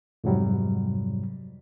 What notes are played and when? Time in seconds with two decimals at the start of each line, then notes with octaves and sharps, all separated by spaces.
0.24 F2 G#2 C3 F#3 G3